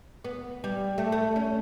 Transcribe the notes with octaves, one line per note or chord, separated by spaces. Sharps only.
B3
G3
A3
A3
C#4